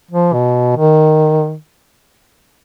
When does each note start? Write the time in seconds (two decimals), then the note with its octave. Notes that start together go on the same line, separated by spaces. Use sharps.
0.11 F3
0.33 B2
0.77 D#3